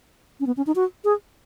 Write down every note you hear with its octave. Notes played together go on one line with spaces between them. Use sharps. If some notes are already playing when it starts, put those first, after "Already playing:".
C#4
B3
C#4
D#4
F#4
G#4